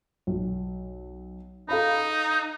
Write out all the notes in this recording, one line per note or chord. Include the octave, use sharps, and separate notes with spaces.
B1
D#4 A4 F5 B5